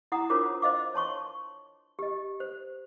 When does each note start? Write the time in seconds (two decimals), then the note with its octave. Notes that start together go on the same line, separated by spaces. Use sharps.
0.12 E4 F#5 A#5 D#6
0.30 D4 F4 A#4 C5 C#5 D6
0.62 C5 D#5 F5 D6
0.94 C#5 A5 C6 C#6
1.99 G4 D#5
2.40 C5